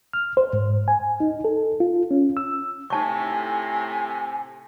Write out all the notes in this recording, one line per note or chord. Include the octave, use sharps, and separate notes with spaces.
F6
C5
G#2
G#5
D#4
A4
F4
C#4
E6
A2 C3 D#4 G#5 A5 C#6